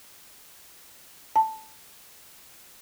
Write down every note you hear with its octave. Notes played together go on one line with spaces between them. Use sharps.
A5